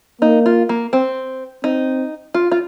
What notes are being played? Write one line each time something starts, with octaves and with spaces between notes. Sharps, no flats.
A#3 D#4
F4
A#3
C4
C4 D#4
F4
F4